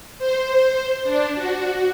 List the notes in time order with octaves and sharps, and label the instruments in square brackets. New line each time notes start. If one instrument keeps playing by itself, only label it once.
[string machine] C5
D4
F#4